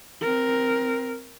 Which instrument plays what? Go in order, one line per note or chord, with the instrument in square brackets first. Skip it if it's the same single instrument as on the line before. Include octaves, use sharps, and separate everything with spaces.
[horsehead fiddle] C4 A#4